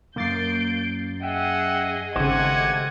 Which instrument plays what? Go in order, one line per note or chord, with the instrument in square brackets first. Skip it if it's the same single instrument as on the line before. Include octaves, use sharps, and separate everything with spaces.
[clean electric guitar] C#2 F#2 [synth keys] A#3 A6 C7 [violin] G6 D7
[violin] G#4 D#5 [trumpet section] E5 F#5 [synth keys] G5
[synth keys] G#1 C#3 [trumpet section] A3 F#5 [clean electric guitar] G4 C5 [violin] D#5 G#6